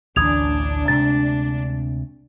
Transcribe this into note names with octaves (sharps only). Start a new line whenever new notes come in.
A1 D2 E3 D4 D#6 G#6 F7
D2 C3 G#3 A6